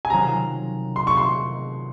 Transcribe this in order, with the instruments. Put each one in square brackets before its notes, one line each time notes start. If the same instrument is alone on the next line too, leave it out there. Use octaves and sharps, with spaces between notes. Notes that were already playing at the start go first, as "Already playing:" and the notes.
[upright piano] G#5
[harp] C3 D#3 F#3 C#4 F4 [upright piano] A#5
[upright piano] C6
C#6
C6